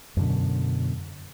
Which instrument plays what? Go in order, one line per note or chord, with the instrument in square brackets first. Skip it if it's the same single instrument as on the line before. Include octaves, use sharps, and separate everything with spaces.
[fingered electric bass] F#2 B2 D3